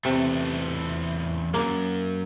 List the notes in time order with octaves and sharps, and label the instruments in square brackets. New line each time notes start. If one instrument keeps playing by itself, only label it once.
[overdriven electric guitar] E2 A3 [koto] C3
[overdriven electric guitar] B1 F#2 [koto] A#3